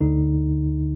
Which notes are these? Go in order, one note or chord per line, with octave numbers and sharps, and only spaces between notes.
D2 D3 D#4